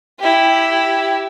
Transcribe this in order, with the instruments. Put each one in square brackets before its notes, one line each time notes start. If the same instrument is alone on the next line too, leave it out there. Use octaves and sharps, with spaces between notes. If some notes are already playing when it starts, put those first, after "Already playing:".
[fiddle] E4 G4